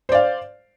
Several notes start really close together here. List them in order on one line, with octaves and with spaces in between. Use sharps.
C5 D5 F5